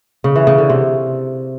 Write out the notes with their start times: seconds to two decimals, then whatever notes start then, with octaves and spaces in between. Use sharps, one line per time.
0.24 C#3
0.36 E3
0.47 C#3
0.58 D3
0.70 C3